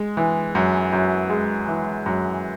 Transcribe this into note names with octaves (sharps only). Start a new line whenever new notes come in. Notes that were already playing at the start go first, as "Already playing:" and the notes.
Already playing: G#3
E3
F#2
F#2
G#3
E3
F#2